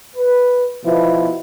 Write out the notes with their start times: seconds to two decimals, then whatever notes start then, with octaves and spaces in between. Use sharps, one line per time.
0.15 B4
0.84 B2 F3 B3 E4